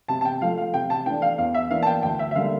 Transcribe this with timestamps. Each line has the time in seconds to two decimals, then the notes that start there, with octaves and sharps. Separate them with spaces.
0.08 C3 A5
0.21 A5
0.25 G5
0.41 F3 A3 F5
0.58 F5
0.74 C3 G5
0.90 A5
1.06 E3 A3 D4 G5
1.22 F5
1.38 E2 F5
1.54 E5
1.71 E3 A#3 D4 F5
1.83 A5
1.87 G5
2.03 D2 G5
2.19 E5
2.31 E5
2.35 D3 G3 A#3 F5